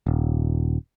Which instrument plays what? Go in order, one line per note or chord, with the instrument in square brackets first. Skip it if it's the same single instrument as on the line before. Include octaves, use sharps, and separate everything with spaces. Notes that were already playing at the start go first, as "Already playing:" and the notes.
[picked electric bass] D#1